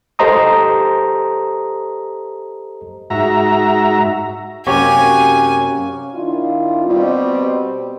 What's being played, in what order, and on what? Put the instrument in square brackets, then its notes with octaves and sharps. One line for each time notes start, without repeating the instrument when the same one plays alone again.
[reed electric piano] G4 A4 C5 D#5 A#5 D#6
[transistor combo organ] G#2 F#4 E5 A#5
[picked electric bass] F#2 C3 [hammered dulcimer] A#3 C#4 [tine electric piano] F#4 G4 C#5 [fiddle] G#5
[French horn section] D#3 D4 E4 F4
B2 G3 C4